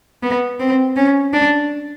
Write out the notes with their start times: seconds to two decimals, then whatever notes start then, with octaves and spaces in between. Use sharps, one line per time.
0.23 B3
0.60 C4
0.96 C#4
1.33 D4